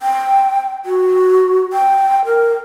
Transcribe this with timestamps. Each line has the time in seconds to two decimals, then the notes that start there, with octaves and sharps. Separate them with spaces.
0.02 G5
0.85 F#4
1.73 G5
2.25 A#4